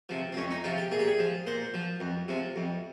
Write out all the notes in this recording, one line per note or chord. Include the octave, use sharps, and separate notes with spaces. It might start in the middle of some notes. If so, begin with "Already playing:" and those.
C3 F3
C4
F2 C#4
D#4
C3 F3 F4
G4
A#2 G#4
G4
G#4
F3
A#2 C5
F3
F2
C3 F3
F2